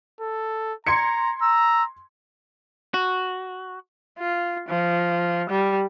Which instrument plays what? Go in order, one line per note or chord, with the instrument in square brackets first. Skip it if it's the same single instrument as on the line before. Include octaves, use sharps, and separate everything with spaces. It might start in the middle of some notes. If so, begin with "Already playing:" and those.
[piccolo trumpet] A4
[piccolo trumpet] A#5 [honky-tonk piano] C6 G#6 C#7
[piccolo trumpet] A#5 [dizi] E6
[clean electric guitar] F#4
[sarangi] F4
F3
G3